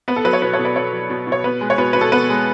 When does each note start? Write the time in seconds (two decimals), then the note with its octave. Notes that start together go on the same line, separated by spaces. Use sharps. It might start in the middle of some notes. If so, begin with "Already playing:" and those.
0.08 B3 B4
0.16 A4
0.24 F#3 B4
0.33 A4 C#5
0.42 B2 B4
0.53 A4 C#5
0.59 B2
0.65 B4 D5
0.76 B3 A4 C#5
0.93 F#3
1.10 B2
1.27 B2 C#5
1.44 B3 B4
1.61 G#3
1.70 C#5
1.78 B2 B4
1.93 B2 B4
2.01 A4
2.12 B3 B4
2.30 G#3